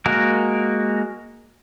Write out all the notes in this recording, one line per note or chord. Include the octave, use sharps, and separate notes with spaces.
G#3 A#3 F#4 A#4